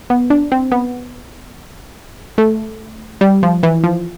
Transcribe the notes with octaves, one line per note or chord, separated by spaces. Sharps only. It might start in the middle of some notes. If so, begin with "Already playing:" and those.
B3
D4
C4
B3
A3
G3
F3
E3
F3